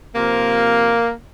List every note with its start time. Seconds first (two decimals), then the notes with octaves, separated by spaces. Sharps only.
0.15 C3 F3 A#3